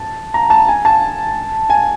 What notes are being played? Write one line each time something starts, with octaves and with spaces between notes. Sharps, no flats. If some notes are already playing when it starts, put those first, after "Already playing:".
Already playing: A5
A#5
A5
G#5
A5
G#5